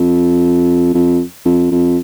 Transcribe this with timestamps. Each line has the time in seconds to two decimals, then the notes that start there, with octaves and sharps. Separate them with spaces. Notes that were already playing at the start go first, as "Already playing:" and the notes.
Already playing: F2
0.94 F2
1.45 F2
1.71 F2